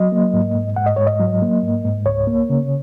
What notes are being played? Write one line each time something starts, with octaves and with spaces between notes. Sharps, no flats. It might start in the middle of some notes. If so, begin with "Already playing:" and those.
Already playing: F#3 D#5
A#3
G#2
G#2
G#2 F#5
D#5
G#2 C#5
D#5
F#3
A#3
G#2
G#2
C#2 C#5
A#3
C#3